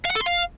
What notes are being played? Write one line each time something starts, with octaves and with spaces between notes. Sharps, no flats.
F5
F#5
A4
C6
F5